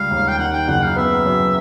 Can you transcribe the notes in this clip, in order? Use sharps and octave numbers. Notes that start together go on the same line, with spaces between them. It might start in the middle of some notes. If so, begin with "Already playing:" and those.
Already playing: C#2 G3 F5
D#2
G5
D#3 F#5
G5
F#1 F#5
F5
B3 E5
F#2